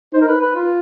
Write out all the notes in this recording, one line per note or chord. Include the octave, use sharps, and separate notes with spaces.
D#4 C5
A#4
B4
B4
F4